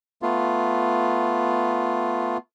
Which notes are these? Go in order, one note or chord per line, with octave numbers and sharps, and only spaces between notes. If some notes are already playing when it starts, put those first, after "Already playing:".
A3 B3 F4